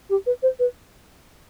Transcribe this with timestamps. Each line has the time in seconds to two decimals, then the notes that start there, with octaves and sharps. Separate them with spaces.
0.09 G4
0.26 B4
0.42 C5
0.59 B4